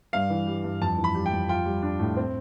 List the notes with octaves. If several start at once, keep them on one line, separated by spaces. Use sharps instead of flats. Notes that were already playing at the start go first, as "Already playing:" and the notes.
G2 F5
E3
G3
G2
F2 A5
E3
B5
G3
G5
F2
F4 G5
G3
D4
A2
C4